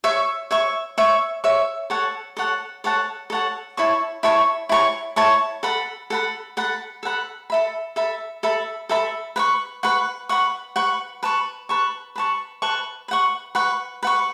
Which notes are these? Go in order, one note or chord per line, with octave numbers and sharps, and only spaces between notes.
C#5 E5 C#6
C#5 E5 C#6
C#5 E5 C#6
C#5 E5 C#6
A4 C#5 F#5 A5
A4 C#5 F#5 A5
A4 C#5 F#5 A5
A4 C#5 F#5 A5
E4 C#5 A5 C#6
E4 C#5 A5 C#6
E4 C#5 A5 C#6
E4 C#5 A5 C#6
A4 F#5 B5
A4 F#5 B5
A4 F#5 B5
A4 F#5 B5
A4 E5 B5
A4 E5 B5
A4 E5 B5
A4 E5 B5
B4 F#5 C#6
B4 F#5 C#6
B4 F#5 C#6
B4 F#5 C#6
B4 A5 C#6
B4 A5 C#6
B4 A5 C#6
B4 A5 C#6
B4 F#5 C#6
B4 F#5 C#6
B4 F#5 C#6